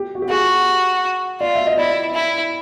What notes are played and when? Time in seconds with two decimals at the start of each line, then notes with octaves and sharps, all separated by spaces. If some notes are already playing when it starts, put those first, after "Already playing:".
Already playing: G4
0.15 F#4
0.22 G4
0.29 F#4 G#4
1.41 F4 D5
1.55 E5
1.67 D#5
1.77 E4 D5
2.14 E4